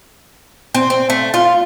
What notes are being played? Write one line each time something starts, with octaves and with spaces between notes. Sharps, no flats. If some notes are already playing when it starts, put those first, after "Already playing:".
C4
C4
A3
F4